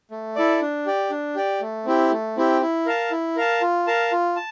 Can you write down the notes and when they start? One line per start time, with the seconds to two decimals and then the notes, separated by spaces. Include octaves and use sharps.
0.11 A3
0.36 E4 A4 D5
0.61 D4
0.86 G4 D5
1.10 D4
1.35 G4 D5
1.61 A3
1.85 C4 E4 G4
2.12 A3
2.37 C4 E4 G4
2.62 E4
2.86 A#4 F5 A5
3.11 E4
3.36 A#4 F5 A5
3.61 F4
3.87 A#4 F5 A5
4.12 F4
4.36 A5